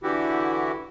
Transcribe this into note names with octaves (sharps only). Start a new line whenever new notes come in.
D3 E3 E4 F#4 G4